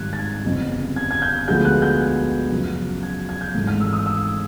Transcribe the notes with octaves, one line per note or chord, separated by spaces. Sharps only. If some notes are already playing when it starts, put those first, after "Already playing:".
Already playing: G#1 G2 D#3 G3 F#6 G#6
A6
G#6
G1 F2 C#3
G#6
G#6
G6
D2 D3 F3 G#3 B3 G6
F#6
G6
F#2 C#3 F3
G#6
G#6
G6
G#1 G#2 E3 A3
F6
E6
D#6
E6